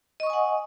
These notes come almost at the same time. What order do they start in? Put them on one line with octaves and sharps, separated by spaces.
D#5 C#6 D#6 G#5 F#5